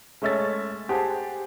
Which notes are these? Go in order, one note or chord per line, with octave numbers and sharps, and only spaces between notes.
G#3 A3 C#4 E5 E6 A6
G4 G#4 C5 F#5 A5